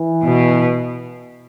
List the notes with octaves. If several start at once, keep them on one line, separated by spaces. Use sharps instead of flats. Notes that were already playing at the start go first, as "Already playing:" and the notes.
Already playing: E3
B2